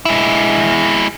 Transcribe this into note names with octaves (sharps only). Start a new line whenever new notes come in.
G#3 E4